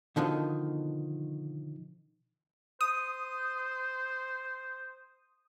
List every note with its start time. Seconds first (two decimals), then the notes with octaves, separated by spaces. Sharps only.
0.16 B2 D3 D#3 F3
2.81 C5 D#6